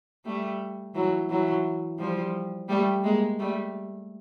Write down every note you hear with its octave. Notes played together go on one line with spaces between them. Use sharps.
G3 A3
E3 F#3
E3 F#3
F3 G3
G3 A3
G#3 A#3
G3 A3